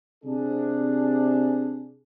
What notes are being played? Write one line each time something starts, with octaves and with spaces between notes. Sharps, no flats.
C3 D4 G#4